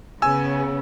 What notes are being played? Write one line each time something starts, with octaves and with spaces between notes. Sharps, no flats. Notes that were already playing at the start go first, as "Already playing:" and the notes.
C#3 B3 C#4 G#5 E6